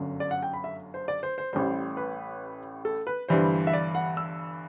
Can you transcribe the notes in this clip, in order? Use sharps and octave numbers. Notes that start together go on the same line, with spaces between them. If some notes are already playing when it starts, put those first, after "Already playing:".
Already playing: G1 F#2 D3
D5
F#5
G5
B5
E5
C5
D5
C5
C5
A1 A2 G3 C5
B4
A4
B4
G1 G2 E3 G3 C5
E5
D5
F#5
E6